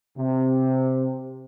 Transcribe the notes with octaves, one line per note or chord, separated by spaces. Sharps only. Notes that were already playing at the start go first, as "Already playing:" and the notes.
C3